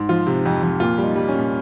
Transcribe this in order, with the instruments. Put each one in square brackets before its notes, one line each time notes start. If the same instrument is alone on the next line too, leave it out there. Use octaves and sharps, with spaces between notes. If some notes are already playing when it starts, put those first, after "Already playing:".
Already playing: [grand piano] G#2
F3 F4
C3
F2
F2
A#2 F4
G3
D#4
G3
C#4
A#2